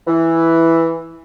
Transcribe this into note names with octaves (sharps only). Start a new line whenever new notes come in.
E3